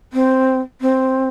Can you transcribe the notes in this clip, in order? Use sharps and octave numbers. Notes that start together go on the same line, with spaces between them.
C4
C4